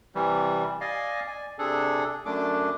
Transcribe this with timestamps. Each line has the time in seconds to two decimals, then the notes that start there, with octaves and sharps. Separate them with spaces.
0.15 C3 E3 G3
0.81 D5 D#5 F5 G#5
1.27 D5 G#5
1.59 C3 D4 G#4 A4
2.26 F#2 A3 D4 D6